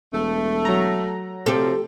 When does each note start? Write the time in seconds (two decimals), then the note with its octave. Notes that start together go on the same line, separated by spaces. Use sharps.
0.13 E1 A3
0.65 F#3 A#5
1.46 C3 F3 G4 A4